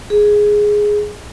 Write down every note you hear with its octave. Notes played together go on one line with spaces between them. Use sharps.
G#4